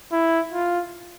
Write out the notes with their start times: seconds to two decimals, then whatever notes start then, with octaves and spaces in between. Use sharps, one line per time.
0.12 E4
0.53 F4